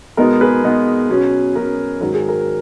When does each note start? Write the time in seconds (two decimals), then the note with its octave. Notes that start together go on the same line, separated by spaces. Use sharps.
0.17 B2 G#3 B3 D#4 A#4
0.41 G#4 B4
0.63 B2 G#3 B3 D#4
1.09 B2 F#3 C#4
1.56 B2 F#3 C#4 A#4
2.01 G#2 D#3 F#3 A#4
2.14 G#4
2.29 A#4